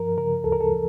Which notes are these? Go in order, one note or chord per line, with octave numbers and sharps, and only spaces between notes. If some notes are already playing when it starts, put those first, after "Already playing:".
Already playing: G2 F3 A#4
C#3 A#4
D2 A4
A#4
A4
F3